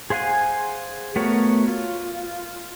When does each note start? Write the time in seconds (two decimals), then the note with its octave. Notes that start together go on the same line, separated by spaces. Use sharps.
0.10 G#4 C5 F5 F#5 G#5
1.16 A3 B3 F#4 A#4 C#5
1.68 F4